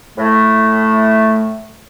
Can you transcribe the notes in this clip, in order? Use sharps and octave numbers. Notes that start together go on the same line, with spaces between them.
A2 A3